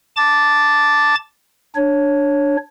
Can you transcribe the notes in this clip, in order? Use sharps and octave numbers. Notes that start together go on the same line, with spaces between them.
A5 D6 A6
D4 C#5